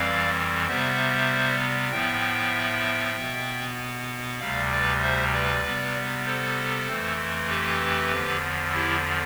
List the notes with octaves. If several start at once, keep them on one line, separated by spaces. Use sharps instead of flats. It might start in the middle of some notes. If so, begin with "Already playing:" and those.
Already playing: F2 E3 G3 C4 D5 F5
C3 G3 B3 C5 E5
A2 F3 B3 E5 G5
B2 B3
D2 C3 G3 D5 F5
B4 D5
C5 E5
B4 D5
C3 G3 B3
A4 C5
F2 E3 A3 C4
G4 B4
E2 D3 F3
E4 G4